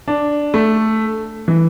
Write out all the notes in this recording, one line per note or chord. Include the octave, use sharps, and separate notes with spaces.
D4
A3
E3